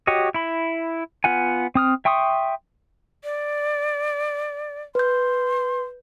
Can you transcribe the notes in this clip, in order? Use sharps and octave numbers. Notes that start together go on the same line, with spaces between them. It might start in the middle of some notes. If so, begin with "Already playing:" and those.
F#4 G4 C#5 D#5
E4 B5
B3 F4 F#5 G#5
C4 D#6 F6
E5 G5 C6 C#6 D#6
D5
B4 C6 G6